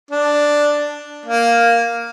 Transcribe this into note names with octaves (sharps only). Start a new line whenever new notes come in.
D4
A#3